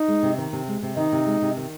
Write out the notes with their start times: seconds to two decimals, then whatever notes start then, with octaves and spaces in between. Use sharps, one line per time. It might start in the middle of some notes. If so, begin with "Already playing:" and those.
Already playing: D#4
0.08 G#3
0.23 C3
0.38 D#3
0.53 C3
0.68 G#3
0.83 C3
0.97 D#3 D#4
1.12 C3
1.26 G#3
1.42 C3
1.57 D#3